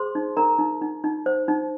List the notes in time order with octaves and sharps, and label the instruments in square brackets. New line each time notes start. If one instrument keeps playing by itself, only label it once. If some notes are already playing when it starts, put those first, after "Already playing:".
Already playing: [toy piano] G#4 C5 C6
D#4
D#4 A#4 A#5
D#4
D#4
D#4
C5
D#4